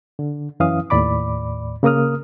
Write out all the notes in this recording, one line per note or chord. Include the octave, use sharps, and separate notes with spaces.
D3
F#2 E3 C#4 F5 D#6
D#2 A2 D5 B5 D6
C#3 A#3 A#4 D#6 F6